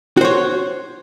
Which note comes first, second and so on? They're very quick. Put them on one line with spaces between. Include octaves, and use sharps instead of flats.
F#4 C5 C#5